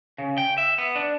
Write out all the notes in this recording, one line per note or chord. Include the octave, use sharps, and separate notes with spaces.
C#3
G5
E5
B3
D4